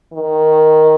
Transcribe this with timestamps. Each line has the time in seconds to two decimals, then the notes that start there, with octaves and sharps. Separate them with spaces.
0.13 D#3